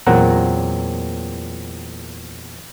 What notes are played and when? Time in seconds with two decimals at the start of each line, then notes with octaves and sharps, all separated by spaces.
0.07 E2 A#2 F#3 C4 F#5 A#5